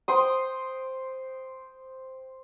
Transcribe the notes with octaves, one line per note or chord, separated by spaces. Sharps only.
C5 G5 C6 D#6